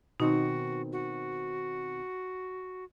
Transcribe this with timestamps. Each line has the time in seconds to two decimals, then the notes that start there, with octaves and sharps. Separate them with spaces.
0.20 B2 D#3 C4 D#4 F#4
0.92 F#4